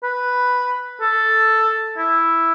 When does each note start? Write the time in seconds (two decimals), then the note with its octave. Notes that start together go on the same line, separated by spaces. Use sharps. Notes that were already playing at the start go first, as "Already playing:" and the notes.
0.03 B4
1.01 A4
1.98 E4